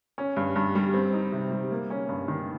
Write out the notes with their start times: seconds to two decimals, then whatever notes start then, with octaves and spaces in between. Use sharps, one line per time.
0.18 C#4
0.36 G2
0.56 G2
0.75 G3
0.94 C4
1.13 D#4
1.32 C3
1.51 G3
1.71 A#3
1.90 C#4
2.09 G2
2.28 D#3